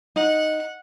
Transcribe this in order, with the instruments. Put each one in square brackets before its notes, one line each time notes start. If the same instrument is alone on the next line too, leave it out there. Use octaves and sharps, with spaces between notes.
[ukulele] D#4 D#5 [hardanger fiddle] F#5